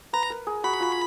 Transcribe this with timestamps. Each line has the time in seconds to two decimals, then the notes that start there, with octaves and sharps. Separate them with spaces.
0.13 B4 A#5
0.30 A#4
0.47 G#4
0.64 F#4 B5
0.80 F4